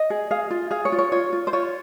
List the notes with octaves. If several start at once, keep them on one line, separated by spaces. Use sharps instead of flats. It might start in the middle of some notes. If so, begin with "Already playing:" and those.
Already playing: D#5
G#4
G#4 F5
F4
G#4 F5
C#5
F4
C#5
F4 C#5
F4
C5
F4 C#5